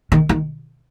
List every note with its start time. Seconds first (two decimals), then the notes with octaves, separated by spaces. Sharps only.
0.12 D#3
0.29 D#3